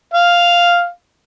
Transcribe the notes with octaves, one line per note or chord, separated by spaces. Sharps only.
F5